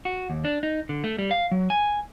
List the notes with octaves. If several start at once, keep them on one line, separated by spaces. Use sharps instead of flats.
F#4
D#2
D4
D#4
D3
A3
G3
F5
F#3
G#5